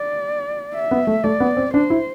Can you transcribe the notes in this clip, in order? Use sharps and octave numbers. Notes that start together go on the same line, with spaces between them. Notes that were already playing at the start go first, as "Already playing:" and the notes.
Already playing: D5
E5
B3
A3
A3 D5
B3
C4
D4 C5
E4